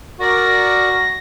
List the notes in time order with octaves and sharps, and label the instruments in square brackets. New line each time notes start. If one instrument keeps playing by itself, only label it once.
[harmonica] F#4 [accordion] A#4 D5 [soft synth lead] A#6